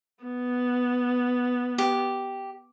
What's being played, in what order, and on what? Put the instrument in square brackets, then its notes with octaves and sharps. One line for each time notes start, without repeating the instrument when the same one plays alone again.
[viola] B3
[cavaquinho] G4